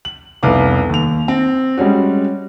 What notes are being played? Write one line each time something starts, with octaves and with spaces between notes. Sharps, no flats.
F#7
F1 C2 B3 F5 D6
D#2 F7
C4
G3 G#3 C#4 F#4